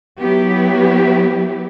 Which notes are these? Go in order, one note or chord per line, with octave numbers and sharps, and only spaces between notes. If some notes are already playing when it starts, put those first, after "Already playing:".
F#3 B3 E4 G4